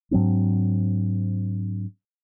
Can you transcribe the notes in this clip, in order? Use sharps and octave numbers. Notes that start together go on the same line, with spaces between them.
G#2 F#3 C4 D4